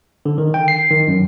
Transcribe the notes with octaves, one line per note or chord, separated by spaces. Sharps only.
D3
D#3
G5
C7
D#3
F#2